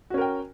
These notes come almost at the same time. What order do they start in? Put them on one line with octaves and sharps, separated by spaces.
F#4 C#4 A#4 G5